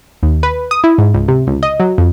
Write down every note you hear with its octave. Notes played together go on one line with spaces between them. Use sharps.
D#2
B4
D#6
E4
G#2
C#2
C3
C#2
D#5
F#3
F2